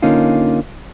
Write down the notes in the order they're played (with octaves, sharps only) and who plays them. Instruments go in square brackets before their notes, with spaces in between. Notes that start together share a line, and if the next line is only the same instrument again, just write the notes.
[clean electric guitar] D3 A#3 C#4 D#4 F4